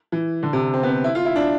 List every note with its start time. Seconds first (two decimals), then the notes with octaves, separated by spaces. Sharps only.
0.12 E3
0.43 D3
0.53 C3
0.74 C4
0.83 B3
0.89 C4
1.04 E4
1.15 F4
1.25 E4
1.36 D4